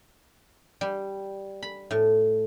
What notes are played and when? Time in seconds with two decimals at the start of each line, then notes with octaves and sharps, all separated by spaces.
0.81 G3
1.62 B5
1.91 A2